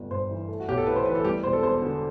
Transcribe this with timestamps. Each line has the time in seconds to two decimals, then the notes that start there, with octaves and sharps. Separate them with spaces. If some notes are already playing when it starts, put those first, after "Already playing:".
Already playing: G1 A3
0.11 G2 C5
0.30 E3
0.48 A3
0.60 F#4
0.68 B1 G4
0.78 A4
0.87 A2 B4
0.96 C5
1.06 E3 B4
1.15 A4
1.25 G3 G4
1.43 E1 C5
1.53 A4
1.63 E2 C5
1.82 D3